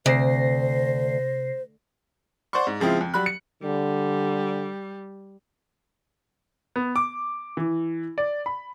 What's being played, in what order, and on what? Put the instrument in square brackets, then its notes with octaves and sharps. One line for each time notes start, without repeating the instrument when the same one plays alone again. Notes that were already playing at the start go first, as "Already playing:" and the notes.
[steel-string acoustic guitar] D2 [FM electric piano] C3 A#6 C7 [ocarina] C5
[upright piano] C5 D5 F#5 C6 C#6
G#2
C#3 F3 G#3 C4 E4 F4
F2
F#3 G3 B5 F#6
C#7
[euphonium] D3 [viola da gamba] G3
[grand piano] B3
D6
E3
D5
B5